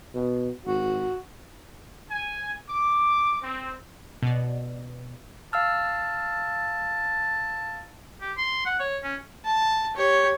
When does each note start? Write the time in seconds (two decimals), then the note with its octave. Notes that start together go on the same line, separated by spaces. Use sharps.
0.15 B2
0.65 G#1 F#4
2.10 G#5
2.69 D6
3.42 C4
4.23 B2 D5
5.53 F5 A5 E6 F6
8.21 G4
8.37 C6
8.66 F#5
8.80 C#5
9.03 C#4
9.45 A5
9.96 G4 C#5